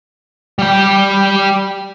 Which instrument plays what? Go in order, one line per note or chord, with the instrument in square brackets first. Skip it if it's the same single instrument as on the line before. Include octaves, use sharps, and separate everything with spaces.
[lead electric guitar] G3 G5